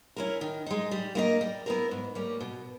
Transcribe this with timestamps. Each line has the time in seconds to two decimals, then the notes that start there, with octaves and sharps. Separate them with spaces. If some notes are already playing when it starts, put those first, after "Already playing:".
0.16 C#4 E4 A#4
0.41 D#3
0.66 G#3 D#4
0.91 G3
1.15 A#3 E4 A#4 D#5
1.41 G3
1.66 B3 E4 A#4
1.91 G#2
2.15 G3 A#3 C#4
2.41 B2